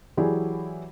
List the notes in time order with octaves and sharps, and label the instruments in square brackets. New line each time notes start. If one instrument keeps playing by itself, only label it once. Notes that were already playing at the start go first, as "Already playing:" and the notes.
[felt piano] E3 F#3 E4 G4 G#4 D5